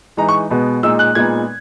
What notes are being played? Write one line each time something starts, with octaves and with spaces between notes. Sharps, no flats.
E3 G#3 D#4 A#5
C#6
B2 G#3 B3
A#2 G#3 D#4 E6
F#6
A#2 G#3 B3 D#4 G#6